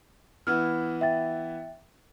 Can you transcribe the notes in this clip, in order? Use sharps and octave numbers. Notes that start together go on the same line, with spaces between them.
E3 B3 E4 F6
E5 G5 A6